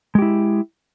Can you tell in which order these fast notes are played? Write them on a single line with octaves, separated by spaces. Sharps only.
G#3 G4 E4